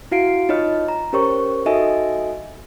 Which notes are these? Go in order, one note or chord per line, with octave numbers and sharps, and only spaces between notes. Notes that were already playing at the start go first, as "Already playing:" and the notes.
E4 F#4 F5 C7 D7
D#4 F4 C#5 D#5 F6
A#5
C#4 G4 A#4 C5 C#5 C#6
D#4 F#4 A4 D#5 E5 G#5